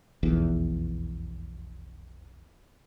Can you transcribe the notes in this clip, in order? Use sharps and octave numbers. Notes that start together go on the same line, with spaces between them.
F1 B1 E2